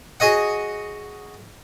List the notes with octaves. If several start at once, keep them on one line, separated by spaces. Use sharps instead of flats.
F#4 G#4 C#5 D#5 F#5